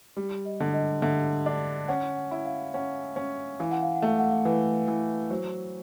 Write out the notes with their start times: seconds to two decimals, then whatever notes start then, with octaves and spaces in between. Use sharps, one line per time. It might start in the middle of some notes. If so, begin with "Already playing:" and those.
0.17 G3
0.45 D#5
0.60 D3
0.74 D#5
1.02 D3 E5
1.46 D4
1.88 C#4 F#5
2.16 F#5
2.31 E4
2.41 F#5
2.45 F5
2.74 C#4 F#5
3.16 C#4
3.60 E3 F5
3.71 F#5
3.83 F5
3.95 F#5
4.02 A3 F5
4.19 F#5
4.31 F5
4.45 E3 B4
4.88 E3
5.30 F#3 C5